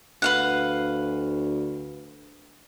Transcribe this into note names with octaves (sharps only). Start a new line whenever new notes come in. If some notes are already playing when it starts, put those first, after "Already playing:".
D2 B4 F5 F#5